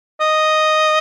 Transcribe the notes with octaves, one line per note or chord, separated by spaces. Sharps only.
D#5